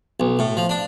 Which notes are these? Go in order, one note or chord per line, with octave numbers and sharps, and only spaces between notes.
B1
A2
F3
D4